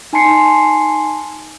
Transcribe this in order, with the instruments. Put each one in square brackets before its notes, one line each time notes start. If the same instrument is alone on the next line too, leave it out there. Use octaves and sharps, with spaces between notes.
[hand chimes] D#4 G#5 A5 C6 C7 C#7